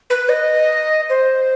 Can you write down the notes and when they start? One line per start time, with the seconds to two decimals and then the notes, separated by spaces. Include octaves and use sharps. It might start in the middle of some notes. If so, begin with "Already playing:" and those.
0.10 B4
0.29 D#5
1.10 C5